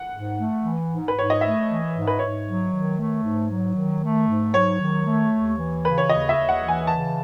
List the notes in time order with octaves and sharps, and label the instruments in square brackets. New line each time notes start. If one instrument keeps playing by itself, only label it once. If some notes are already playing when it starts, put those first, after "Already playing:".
Already playing: [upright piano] F#5
[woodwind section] G#2
A3
E3
G#2
[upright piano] B4
[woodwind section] G#2 [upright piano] C#5
[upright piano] D#5
[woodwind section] A3 [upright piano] E5
[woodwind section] E3
G#2
[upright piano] B4
[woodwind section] G#2 [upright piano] C#5
[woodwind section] F#3
D#3
A3
G#2
F#3
D#3
A3
G#2
[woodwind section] F#3 [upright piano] C#5
[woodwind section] D#3
A3
D#2
E3
[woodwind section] C#3 [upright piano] B4
[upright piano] C#5
[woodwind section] D#2 [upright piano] D#5
[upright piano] E5
[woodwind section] D#2
[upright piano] F#5
[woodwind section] E3
[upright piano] G#5
[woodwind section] C#3 [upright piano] A5